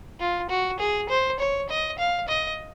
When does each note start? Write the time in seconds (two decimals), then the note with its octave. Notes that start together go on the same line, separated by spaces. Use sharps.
0.20 F4
0.50 F#4
0.79 G#4
1.09 C5
1.39 C#5
1.70 D#5
1.98 F5
2.28 D#5